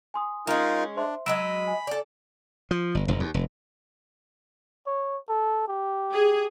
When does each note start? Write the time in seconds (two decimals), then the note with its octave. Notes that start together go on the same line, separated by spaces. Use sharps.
0.14 G#5 C6 D#6
0.47 G#3 C#4 D#4 F4 A#4
0.97 D4 C5 E5 C6
1.26 F#3 G#3 D#5 B5 E6 D7 E7
1.67 G#5
1.87 A4 D5
2.71 F3
2.95 G1
3.08 F1
3.20 D#2
3.34 F1
4.87 C#5
5.29 A4
5.68 G4
6.13 G#4